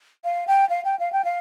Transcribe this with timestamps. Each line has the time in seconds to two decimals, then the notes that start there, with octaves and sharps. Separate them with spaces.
0.24 F5
0.47 G5
0.69 F5
0.84 G5
0.99 F5
1.12 G5
1.24 F5